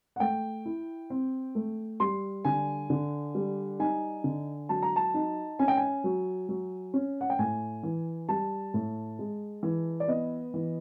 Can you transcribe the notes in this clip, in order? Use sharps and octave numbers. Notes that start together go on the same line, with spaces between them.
F#5
A3 G5
E4
C4
A3
G3 C6
D3 G#5
D3
G3
D#4 G#5
D3
F#3 A5
A#5
A5
D#4
C#4 G#5
G5
G#5
F#3
F#3
C#4
F#5
G5
A2 G#5
E3
G3 A5
A2
G#3
E3
D5
B3 D#5
E3